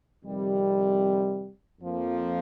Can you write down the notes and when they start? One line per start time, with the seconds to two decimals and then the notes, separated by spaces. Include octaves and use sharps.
0.23 F2 C3 D#3 G3
1.81 F2 F3 A#3